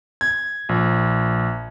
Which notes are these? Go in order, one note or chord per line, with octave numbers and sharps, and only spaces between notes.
G#6
A#1